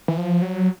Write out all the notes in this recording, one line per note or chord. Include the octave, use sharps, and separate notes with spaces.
E3
F3
F#3